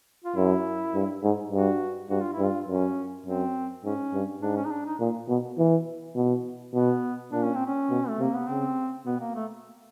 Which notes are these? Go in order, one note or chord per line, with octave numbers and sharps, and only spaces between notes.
F4
F#2 E4
G2
G#2
G2 F#4
G2 F#4
F4
E4
G2
F4
F#2 C#4
F#2 C4
G#2 C#4
G2
G#2 D4
C#4
D#4
D4
D#4
A#2
B2
E3
B2
B2 B3
A#2 D4
C#4
C4
C#4
B2
A3
C3 A#3
B3
C#3 C4
B2 B3
A#3
A3